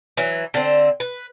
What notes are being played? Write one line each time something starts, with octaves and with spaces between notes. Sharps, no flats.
E3 F#3
D3 C4
B4